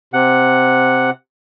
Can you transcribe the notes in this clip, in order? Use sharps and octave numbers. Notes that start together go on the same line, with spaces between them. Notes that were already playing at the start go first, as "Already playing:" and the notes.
C3 F#5